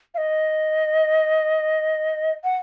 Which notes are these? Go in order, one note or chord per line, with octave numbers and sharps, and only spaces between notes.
F5
D#5
F#5